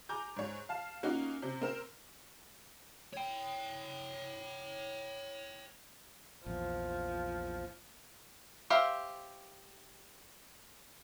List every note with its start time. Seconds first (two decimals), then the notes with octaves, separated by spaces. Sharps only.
0.09 G#5 A#5 D6 G6
0.36 G#2 C#5
0.69 F5 A5
1.03 A#3 C#4 D#4 F4 F#4
1.42 C3
1.61 C4 A#4 E7
3.14 C#5 G5
6.46 A#1 E2 F3
8.70 G4 C5 E5 F5